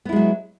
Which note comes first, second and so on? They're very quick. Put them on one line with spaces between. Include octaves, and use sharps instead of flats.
B3 E4 G#3 F#3